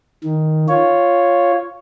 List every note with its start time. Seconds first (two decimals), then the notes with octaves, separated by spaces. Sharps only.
0.24 D#3
0.69 F4 C#5